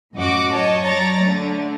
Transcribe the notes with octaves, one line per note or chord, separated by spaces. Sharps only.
F#2 A2 F#4 D#5 D6
C#5 D#5 A5
F#3 C#5 D5 A#5 A6 A#6
D3 A3